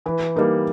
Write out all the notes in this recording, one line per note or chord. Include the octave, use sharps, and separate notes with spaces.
E3 B4
G3 A#3 D#4 A#4